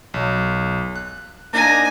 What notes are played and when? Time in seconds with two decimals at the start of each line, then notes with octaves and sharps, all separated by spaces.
0.14 B1
0.96 F#6
1.53 A#3 D4 D#4 G#5 A#5